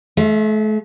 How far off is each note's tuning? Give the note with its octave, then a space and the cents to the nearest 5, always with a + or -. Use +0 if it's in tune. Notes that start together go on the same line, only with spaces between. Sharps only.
A3 -40 E5 +30